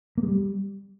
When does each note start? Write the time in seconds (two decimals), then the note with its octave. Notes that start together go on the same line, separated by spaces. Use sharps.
0.18 A#3
0.23 G#3
0.28 G3